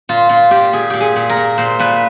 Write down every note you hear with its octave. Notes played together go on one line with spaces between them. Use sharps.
A#2 F4
A#2 F4
A#2 G4
A#2 G#4
A#2 G4
G#4
A#2
A#4
A#2
A#2 C5
A#2 B4